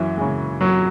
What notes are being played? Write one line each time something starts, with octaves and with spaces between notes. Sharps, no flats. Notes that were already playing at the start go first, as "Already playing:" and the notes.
Already playing: F#2 E3
C#3 G#3
F#2 F#3